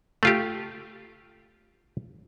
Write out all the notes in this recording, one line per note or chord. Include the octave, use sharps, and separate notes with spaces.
A3 F4 G4